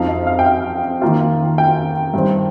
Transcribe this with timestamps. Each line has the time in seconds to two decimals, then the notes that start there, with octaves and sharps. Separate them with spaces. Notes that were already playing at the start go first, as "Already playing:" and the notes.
Already playing: F2 F3 D#4 F5
0.08 D#5
0.27 F5
0.39 G5
0.46 F5
1.02 D#3 A#3 F4
1.58 G5
2.14 G2 D#3 C4